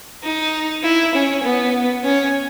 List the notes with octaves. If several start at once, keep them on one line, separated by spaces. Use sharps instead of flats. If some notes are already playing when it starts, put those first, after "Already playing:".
D#4
E4
C#4
B3
C#4